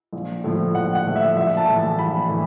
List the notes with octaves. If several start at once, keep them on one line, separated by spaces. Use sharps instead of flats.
A#1
A2 F3 A3
A#1 F#5
F#5
A2 F3 A3
E5
A#1 E5
A5
A2 E3
A5
A#1 B5
A2 E3